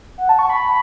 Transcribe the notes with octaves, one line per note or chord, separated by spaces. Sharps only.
F#5
A5
C#6
B5